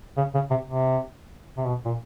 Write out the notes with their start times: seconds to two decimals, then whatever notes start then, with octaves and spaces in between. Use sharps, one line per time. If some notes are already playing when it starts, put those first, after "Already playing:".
0.17 C#3
0.35 C#3
0.51 C3
0.68 C3
1.57 C3
1.66 B2
1.85 A#2